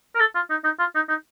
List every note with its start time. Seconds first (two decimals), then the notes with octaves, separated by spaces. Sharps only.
0.15 A#4
0.20 A4
0.35 F4
0.50 D#4
0.64 D#4
0.79 F4
0.95 D#4
1.09 D#4